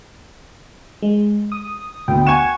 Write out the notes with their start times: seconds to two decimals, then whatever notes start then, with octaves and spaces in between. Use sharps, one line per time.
1.02 G#3
1.52 D#6
2.08 D2 B3 G5
2.27 F#5 G#5 C#6 G#6 E7